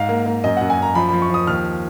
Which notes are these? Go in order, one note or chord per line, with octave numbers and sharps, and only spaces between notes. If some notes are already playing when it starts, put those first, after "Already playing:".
Already playing: G#2 F5
A#3
A#3
F#2 D#5
F#2 F#5
G#5
F#2 A#5
F3 B5
F3 B5
C#6
F3 D#6
D#2 F6